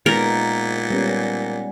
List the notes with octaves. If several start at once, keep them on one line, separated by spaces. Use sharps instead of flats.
A#2 G#3 B3 D#4 A#4
G3 B3 C#4